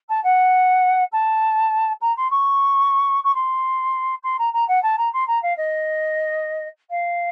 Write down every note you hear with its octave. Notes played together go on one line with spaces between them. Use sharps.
A5
F#5
A5
A#5
C6
C#6
C#6
C6
C6
A#5
A#5
F#5
A5
A#5
C6
A#5
F5
D#5
F5